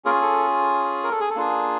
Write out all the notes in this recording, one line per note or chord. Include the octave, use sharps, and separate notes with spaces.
A#3 C#4 F4 G#4 A#4
A4
A#4
A4
G#4
A4
A#3 D4 F4 G#4